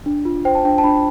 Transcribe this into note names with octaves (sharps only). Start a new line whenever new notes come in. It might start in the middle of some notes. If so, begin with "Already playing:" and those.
D4
F4
C5 G5
A5
D4 G5
A5
D4 B5